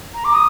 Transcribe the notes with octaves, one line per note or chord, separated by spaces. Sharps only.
A#5
D6
D#6